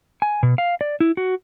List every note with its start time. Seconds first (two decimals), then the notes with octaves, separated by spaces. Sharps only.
0.22 G#5
0.43 B2
0.58 F5
0.81 D5
1.00 E4
1.17 F#4